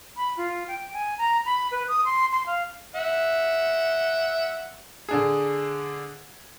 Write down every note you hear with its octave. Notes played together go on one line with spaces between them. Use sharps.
B5
F4
G5
G#5
A#5
B5
B4
D#6
C6
C6
F5
E5 F#5
D3 D4 G#4